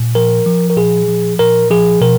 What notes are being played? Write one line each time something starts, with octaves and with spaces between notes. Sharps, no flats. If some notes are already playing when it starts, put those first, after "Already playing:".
Already playing: A#2
F3 A#4
F3
A#4
A#2 G#4
F3
A#2 A#4
F3 G#4
B2 A#4